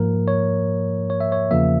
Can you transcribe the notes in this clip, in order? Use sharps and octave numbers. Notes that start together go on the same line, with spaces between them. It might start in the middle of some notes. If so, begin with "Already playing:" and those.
Already playing: G#2 F3 A#3 A#4
C#5
C#5
E5
C#5
E2 C#3 F3 A#3 E5